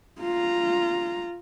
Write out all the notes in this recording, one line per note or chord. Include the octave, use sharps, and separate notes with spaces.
F4 A#5